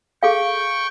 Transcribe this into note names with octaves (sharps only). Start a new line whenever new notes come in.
G#4 A4 F5 G5 C#6